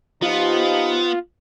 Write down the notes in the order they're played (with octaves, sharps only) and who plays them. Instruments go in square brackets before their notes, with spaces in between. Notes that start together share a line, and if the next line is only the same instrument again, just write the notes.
[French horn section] F3 D#4 G4 [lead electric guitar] B3 [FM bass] F4